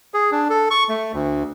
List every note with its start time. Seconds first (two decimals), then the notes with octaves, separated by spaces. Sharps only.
0.14 G#4
0.32 D4
0.50 A4
0.71 C#6
0.89 A3
1.14 D2